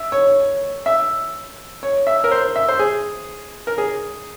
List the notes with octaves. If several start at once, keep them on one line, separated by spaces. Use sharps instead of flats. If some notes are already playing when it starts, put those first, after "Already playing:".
Already playing: E5
C#5
E5
C#5
E5
A#4
C5
E5
C5
G#4
A#4
G#4